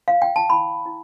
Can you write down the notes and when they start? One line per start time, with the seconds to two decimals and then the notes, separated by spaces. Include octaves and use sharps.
0.08 F5
0.22 G5
0.36 A5
0.50 E4 B5
0.86 E4